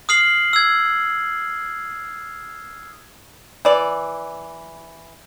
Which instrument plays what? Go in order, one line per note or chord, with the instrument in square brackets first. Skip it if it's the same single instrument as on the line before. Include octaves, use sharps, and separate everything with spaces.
[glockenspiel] D#6 F6 C7 F#7
E6 G#6
[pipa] E3 D5